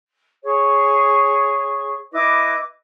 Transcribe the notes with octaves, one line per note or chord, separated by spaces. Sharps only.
G#4 C#5 C#6
E4 B4 D#5 D6